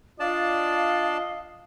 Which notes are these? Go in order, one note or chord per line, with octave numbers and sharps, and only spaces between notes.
D4 F4 D5 D#5 F5 A5